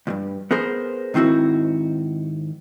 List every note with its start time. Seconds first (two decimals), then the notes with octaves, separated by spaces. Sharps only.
0.07 C#2 G2
0.51 B3 G#4 A#4 C5
1.14 G#2 D#3 C4 E4 F#4